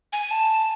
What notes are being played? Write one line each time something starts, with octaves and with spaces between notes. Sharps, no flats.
G#5
A5